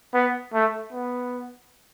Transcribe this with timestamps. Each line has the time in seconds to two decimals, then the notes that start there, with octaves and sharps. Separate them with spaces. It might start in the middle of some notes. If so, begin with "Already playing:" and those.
0.14 B3
0.53 A3
0.93 B3